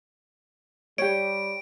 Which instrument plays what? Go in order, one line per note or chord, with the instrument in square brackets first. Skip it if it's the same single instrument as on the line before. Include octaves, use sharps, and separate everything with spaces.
[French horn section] G3 [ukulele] G4 C#5 [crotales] D7